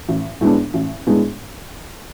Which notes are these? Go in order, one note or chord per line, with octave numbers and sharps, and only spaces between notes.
A1
A2 G#3 B3 D4
A1
A2 G#3 B3 D4